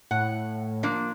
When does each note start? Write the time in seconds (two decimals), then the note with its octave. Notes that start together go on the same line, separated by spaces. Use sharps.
0.11 A2 F#5
0.83 F3 A#3 D4